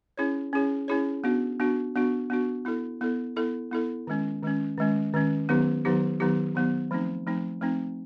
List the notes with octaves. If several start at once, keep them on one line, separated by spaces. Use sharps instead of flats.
C#4 E4 G#4 C#5
C#4 E4 G#4 C#5
C#4 E4 G#4 C#5
B3 D4 F#4
B3 D4 F#4
B3 D4 F#4
B3 D4 F#4
B3 E4 A4
B3 E4 A4
B3 E4 A4
B3 E4 A4
D#3 G#3 C#4
D#3 G#3 C#4
D#3 G#3 C#4
D#3 G#3 C#4
D#3 F#3 B3 D#4 G4
D#3 F#3 B3 D#4 G4
D#3 F#3 B3 D#4 G4
D#3 F#3 B3 D#4 G4
F3 A3 C4 D#4
F3 A3 C4 D#4
F3 A3 C4 D#4